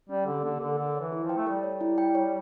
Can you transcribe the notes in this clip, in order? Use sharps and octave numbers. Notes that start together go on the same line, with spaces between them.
G3 C#4
D3 G4
D3 A#3
D3 A#4
D3 A4
C#5
E3
E4
F3
G5
A3
G3 A4
C#5
E4
G5
C#5